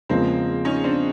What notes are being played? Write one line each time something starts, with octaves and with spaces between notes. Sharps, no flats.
E2 C#3 F3 G#3 A#3 C4
C#4 D#4
C4 D4